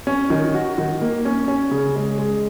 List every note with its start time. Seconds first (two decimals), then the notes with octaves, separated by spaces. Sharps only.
0.07 C#4
0.30 D#3
0.54 F#4
0.78 D#3
1.01 A#3
1.25 C#4
1.48 C#4
1.71 C#3
1.96 G#3
2.18 G#3